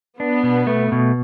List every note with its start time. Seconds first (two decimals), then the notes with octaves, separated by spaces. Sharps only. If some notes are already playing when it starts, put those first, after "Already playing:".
0.19 B3 D4
0.43 B2
0.67 A3
0.92 B2